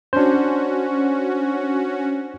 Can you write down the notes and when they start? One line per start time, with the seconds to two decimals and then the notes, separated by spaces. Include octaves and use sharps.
0.13 C#4 D4 F#4 C5